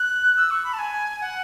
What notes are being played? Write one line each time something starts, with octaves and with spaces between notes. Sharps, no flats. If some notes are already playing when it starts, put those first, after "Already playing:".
Already playing: F#6
E6
C#6
B5
A5
G#5
F#5